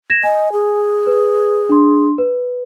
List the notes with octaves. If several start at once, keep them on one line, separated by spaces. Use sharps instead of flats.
G#6 A#6 E7
D#5 G#5
G#4
B4
D4 C6
B4